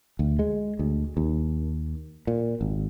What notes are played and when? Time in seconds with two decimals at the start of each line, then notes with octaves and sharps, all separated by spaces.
0.19 D2
0.39 G#3
0.79 D2
1.17 D#2
2.27 A#2
2.61 G#1